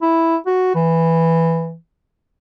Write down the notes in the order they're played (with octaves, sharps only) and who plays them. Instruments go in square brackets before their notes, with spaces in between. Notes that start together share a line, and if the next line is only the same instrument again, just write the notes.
[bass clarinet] E4
F#4
E3